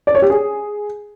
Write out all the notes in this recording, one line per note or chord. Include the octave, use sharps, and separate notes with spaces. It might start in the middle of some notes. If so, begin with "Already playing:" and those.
D5
C#5
G4
G#4